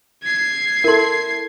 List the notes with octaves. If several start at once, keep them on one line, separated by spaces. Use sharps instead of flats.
G#6 C7
E4 A4 A#4 C6